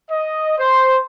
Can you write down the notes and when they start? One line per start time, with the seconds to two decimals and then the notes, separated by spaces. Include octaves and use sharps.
0.10 D#5
0.58 C5